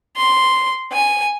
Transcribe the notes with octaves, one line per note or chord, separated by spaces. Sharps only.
C6
G#5